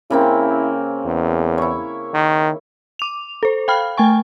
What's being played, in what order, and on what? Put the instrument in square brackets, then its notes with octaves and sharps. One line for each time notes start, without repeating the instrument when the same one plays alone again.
[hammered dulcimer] C#3 A#3 C4 [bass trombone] E4
[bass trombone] E2
[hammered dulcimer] E4 C#5
[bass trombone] D#3
[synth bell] D6 F7
A4 C5
F5 G5 B5 F6
A3 G5 G#5 C#6